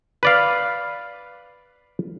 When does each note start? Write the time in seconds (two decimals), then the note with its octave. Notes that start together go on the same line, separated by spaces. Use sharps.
0.23 B4 D5 F5